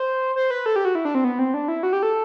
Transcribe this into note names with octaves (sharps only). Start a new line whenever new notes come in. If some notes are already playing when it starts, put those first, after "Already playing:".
Already playing: C5
C5
B4
A4
G4
F#4
E4
D4
C4
B3
C4
D4
E4
F#4
G4
A4